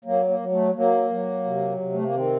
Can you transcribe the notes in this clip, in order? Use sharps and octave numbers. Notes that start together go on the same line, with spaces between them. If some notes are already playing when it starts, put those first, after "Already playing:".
F#3 A#3
A#3
F#3
A3
F#3 A#3
F#3
C3
C3
A3
A#3
D#3 C4